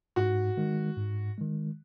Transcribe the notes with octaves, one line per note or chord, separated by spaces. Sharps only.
G#2 F#4
D#3 G#3
G#2
D#3 G#3